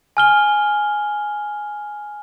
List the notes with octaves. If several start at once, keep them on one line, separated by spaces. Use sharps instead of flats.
G#5 F6 G7